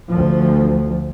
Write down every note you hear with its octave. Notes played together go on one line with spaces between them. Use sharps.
D2 F3